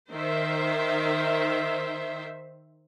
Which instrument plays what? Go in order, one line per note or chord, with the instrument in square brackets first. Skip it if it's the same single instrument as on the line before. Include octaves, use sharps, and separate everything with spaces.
[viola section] D#3 C5 E5